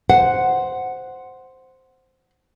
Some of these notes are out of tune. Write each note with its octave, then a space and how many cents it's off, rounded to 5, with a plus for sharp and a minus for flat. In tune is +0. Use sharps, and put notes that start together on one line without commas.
C5 +0 F#5 +0